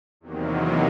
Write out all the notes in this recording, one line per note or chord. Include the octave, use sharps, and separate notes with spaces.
E2 C3 D#3 F#3 A#3